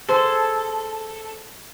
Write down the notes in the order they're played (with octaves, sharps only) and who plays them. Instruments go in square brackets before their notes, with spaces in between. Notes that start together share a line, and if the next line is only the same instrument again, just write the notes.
[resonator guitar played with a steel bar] G#4 C5 [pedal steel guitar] A4